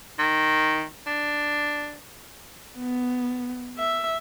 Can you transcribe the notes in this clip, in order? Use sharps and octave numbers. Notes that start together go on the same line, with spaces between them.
D#3
D4
B3
E5